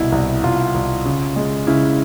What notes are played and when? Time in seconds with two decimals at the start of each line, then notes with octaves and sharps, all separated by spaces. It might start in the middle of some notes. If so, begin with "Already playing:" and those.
Already playing: C2 B2 E4
0.12 C2
0.43 C2 F4
0.74 C2
1.05 C#3
1.36 G#3
1.67 C#3 E4